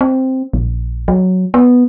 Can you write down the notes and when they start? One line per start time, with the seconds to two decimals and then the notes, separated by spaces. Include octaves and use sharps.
0.01 C4
0.53 A#1
1.08 F#3
1.54 B3